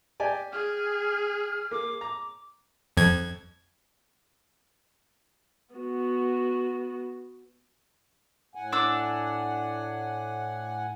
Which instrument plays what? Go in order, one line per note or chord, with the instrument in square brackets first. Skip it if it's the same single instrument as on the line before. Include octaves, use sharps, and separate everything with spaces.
[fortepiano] G4 D5 G#5
[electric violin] G#4 [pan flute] F6
[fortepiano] A#3 [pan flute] D6
[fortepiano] A#5 [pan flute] D6
[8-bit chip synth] F2 G#6
[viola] B3 F#4
[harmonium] A2 F#5 G#5
[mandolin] D4 D6 E6